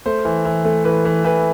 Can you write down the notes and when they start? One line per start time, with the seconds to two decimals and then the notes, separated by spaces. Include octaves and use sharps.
0.06 A3 C5
0.25 E3
0.45 E3
0.65 A3
0.85 E3 B4
1.05 E3
1.24 E3 B4